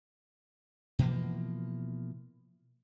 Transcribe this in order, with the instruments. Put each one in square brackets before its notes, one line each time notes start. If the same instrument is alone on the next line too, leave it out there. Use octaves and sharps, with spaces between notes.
[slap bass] B2 E3 F3 A#3